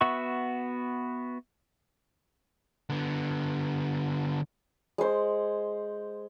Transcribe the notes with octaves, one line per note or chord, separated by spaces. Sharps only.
B3 F#4 E5 C#6
D3 B3
G#3 C5